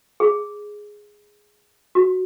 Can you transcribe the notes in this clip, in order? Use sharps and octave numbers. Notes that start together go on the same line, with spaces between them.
G#4
F#4